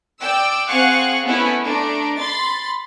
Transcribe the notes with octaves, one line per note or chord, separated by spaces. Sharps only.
D5 G5 E6
C4 G#4 F5 F#5 C#6 F#6
A3 B3 C#4 E4 B4
A3 D4 A#5
B5 C6 A6